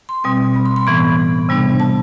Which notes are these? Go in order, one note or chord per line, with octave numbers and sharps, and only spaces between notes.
C6
B2 G3 C4
B5
C6
C6
A2 E3 B3 B5
C3 G3 B3 D4
A5